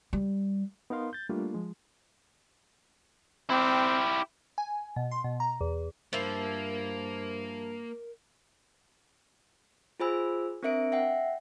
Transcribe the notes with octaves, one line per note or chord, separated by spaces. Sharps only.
G3
B3 D#4 A#4 F5 C6
G6 A6
G3 A3 A#3 D4 F4
F3 G#3
C4 E4 G4
G#5
B2
C6
B2
A#5
E2
G2 F3 A#3 E4 A#4
F4 G#4 C5 G#5 B5 E6
C4 D4 A#4 E5 C#7 D7
E5 F#5 G5